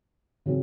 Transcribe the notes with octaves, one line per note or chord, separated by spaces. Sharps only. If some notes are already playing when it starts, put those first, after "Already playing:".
C#3 F#3 C4